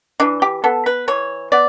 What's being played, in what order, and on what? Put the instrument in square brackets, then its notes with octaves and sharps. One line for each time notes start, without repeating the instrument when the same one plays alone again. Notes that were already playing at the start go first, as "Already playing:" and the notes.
[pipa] E3 D4
G4
B3 A4
B4
E3 C#5
B3 D5